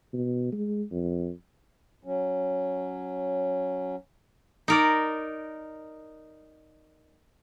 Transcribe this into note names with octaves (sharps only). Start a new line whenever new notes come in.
B2
G#3
F2
F#3 C#4
D#4 A#4 D5